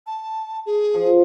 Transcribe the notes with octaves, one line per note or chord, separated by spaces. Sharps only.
A5
G#4
F3